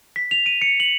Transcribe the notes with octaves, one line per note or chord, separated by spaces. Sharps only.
B6
F7
D#7
C#7
F#7